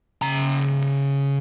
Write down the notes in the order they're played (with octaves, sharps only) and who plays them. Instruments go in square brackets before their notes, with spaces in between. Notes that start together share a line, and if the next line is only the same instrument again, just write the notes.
[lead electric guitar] C#3 A#5